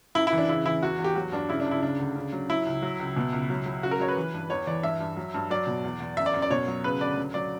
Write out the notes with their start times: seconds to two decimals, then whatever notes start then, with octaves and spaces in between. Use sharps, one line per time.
0.15 F#2 E4
0.27 E4
0.33 E3
0.38 D4
0.49 C#3 E4
0.65 E3 E4
0.82 E2 F#4
0.99 E2
1.04 G4
1.15 F#3 F#4
1.32 G2 D4
1.49 C#3 E4
1.60 D4
1.66 C#2
1.71 E4
1.83 C#3 D4
2.00 D2
2.16 C#3
2.32 F#3
2.49 F#3 E4
2.66 C#2
2.82 F#3
2.99 C#2
3.16 B2
3.33 C#2
3.50 F#3
3.66 F#3
3.83 C#3 F#4
3.91 A#4
4.00 F#3 C#5
4.08 B4
4.16 E3
4.34 G2
4.50 E2 C#5
4.67 E3 D5
4.83 G2 E5
5.00 G2
5.17 F#3
5.34 G2
5.50 F#3 D5
5.67 B2
5.84 E2
6.00 E2
6.17 F#2 E5
6.26 D5
6.34 F#2
6.42 D5
6.51 B2 C#5
6.68 F#3
6.84 C#3 B4
7.01 D2 D5
7.17 F#3
7.34 F#3 D5